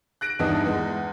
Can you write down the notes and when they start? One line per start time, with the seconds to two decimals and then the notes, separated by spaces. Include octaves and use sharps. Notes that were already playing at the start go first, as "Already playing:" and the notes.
0.21 F#6 A#6 D7
0.39 E2 G2 E3 D4 D#4 D#6
0.66 E2 G#3